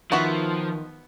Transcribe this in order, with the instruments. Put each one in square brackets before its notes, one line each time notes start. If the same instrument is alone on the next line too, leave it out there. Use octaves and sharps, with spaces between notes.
[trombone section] D#3 [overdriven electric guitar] F3 [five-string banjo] B3 F#4 E5